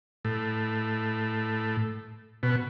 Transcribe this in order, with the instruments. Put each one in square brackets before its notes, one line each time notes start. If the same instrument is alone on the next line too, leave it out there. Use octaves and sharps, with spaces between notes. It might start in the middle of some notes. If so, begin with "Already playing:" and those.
[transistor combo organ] A2
B2